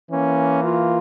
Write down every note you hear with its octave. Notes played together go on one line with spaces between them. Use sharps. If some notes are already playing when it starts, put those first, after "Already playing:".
E3 A#3 C#4
F4